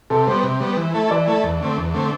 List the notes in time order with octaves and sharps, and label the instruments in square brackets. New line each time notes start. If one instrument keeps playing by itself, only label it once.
[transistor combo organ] C3 [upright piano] A4
[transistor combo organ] G3 B3 [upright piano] C5
[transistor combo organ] C3
G3 B3
E3
A3 E4 A4
[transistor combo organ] E3 [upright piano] D5
[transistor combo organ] A3 E4 A4
E2
D3 A3 C4
E2
D3 A3 C4